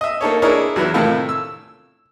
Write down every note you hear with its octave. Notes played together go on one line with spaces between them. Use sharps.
D#5 E5
A#3 D#4 A4 C#5
D4 E4 G#4 A#4 C#5 D#5
E2 F#3 B3 E4
A2 C3 D#3 A3 E4 F4
E6